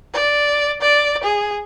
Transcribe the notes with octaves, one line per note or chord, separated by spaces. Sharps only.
D5
D5
G#4